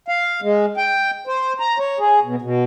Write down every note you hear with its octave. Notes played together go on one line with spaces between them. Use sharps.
F5
G#3
G5
C5
A#5
C#5
G#4
B2
B2